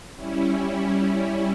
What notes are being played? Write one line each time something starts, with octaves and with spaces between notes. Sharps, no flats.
G3 C#4 E4